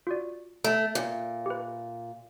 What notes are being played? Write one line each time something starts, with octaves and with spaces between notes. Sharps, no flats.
F4 F#4 D5
A3 A4
A#2
G4 B4